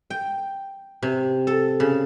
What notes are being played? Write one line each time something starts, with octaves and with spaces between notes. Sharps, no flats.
G5
C3
A4
C#3